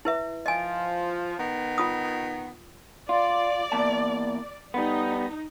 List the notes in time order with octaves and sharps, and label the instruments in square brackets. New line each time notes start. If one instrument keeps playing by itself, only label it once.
[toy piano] E4 B4 E5
[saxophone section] F3 [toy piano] D#5 G#5
[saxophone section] D#3 B3
[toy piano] F4 D#6
[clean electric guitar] F4 [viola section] D5
[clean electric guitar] E2 A#3 A5
[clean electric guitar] G3 B3 [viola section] D#4